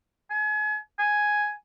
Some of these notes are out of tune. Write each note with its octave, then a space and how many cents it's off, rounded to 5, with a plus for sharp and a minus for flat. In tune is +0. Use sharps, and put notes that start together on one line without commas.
G#5 +35
G#5 +5